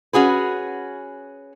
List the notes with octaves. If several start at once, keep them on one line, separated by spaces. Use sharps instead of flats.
C#4 F#4 G#4 B4